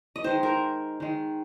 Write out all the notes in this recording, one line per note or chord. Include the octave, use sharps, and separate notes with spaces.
D#5
D#3 G#3 C5
A#4
D#3 G#3